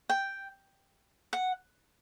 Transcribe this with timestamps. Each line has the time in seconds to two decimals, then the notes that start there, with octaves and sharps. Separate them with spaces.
0.09 G5
1.33 F#5